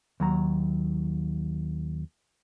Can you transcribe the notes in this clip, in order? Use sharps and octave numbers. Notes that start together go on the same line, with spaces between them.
D#2 F#3 A#5